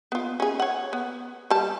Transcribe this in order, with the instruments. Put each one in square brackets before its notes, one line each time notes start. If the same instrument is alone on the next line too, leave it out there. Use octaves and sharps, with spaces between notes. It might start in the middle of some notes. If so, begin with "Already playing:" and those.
[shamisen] B3 F4
C#4 G#4
C#5 F#5
B3
G3 A5